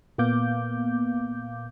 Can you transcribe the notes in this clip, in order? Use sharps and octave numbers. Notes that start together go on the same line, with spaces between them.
A#2 A#3 B3 F5 D6 G6